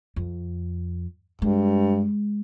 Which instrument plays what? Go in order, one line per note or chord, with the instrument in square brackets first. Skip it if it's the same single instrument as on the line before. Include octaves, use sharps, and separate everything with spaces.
[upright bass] F2
[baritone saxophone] G2 [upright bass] G#3